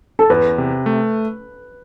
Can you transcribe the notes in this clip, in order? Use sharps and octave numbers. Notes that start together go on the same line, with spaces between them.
A4
E2 B4
C3
A3